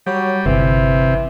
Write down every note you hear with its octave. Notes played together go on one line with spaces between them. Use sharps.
F#3 G3
G1 C3 E3